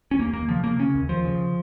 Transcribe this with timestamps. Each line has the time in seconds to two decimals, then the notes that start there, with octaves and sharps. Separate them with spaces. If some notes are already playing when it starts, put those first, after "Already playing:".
0.11 C#4
0.19 D#2 A#3
0.33 D#2 A#3
0.49 C#3 F3
0.64 C#3 A#3
0.79 C#3 C#4
0.95 D#2
1.09 D#2 F3
1.25 C#3